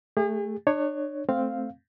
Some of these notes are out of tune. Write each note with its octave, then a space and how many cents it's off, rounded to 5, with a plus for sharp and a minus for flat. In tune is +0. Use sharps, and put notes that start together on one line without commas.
A3 +0 G#4 -40
D4 +35 C#5 +0
A3 +0 C4 +0 F5 +0